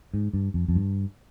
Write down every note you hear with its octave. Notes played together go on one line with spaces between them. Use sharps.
G#2
G2
F2
F2
G2